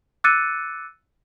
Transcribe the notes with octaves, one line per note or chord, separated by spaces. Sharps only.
D6 E6 F#6 A6 C#7 D#7